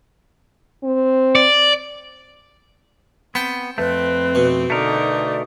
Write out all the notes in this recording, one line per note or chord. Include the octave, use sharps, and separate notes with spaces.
C4
D5
B3 C4 G5 A5
F2 A3 C4 B4
B2
D3 A3 D#4 A#4 D5